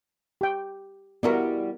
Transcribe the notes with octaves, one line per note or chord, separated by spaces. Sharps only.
G4 G5
G3 B3 E4 F#4 A#4